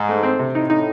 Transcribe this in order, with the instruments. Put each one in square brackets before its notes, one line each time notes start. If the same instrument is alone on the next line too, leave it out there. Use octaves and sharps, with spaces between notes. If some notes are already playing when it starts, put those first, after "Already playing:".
Already playing: [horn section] G#2
[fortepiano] A3
C4
C3
[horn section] A2 [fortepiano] D#4
[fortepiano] D#4